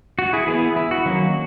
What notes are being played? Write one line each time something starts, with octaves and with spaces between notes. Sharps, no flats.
F#4
E4 G#4
E3 B3 E4 G#4
E4
F#4
D#3 F#3 A#3 C#4